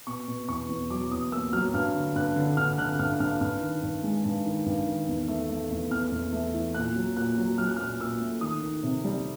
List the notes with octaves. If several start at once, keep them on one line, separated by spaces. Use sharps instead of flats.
B2 C#6
B2
E2 C#6
E2
F#3 D6
E2 D#6
A#3 E6
F#3 F6
G2 F6
D3
G2 F#6
D3
D3 F6
D3 F#6
G2 F6
G2 F6
G2 F6
D#3
G2
G#3
G2
D#3
G2
D#3
E2
A3
A3
E2
E2 F6
E2
A3
E3
A#2 F#6
F#3
A#2 F#6
F#3
F#3 F6
F#6
A#2 F6
A#2 E6
A3
D#3 D#6
D#3
C3
G3